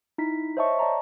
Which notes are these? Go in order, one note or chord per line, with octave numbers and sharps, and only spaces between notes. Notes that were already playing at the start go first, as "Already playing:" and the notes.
D#4 E4 B6
C5 C#5 D#5 E5 A5 C#6
D5 A5 A#5